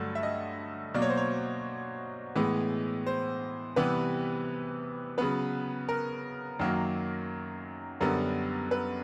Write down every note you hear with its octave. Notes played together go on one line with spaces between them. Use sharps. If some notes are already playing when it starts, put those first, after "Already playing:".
Already playing: G2 D3 F#3 A3
E5
D#5
B2 F#3 A#3 D5
C#5
C5
C#5
A2 E3 G#3 B3
C5
C3 E3 G3 B3 B4
C#3 F#3 B3 B4
A#4
F#2 D#3 F#3 A#3
F#2 D3 G3 B3 A#4
B4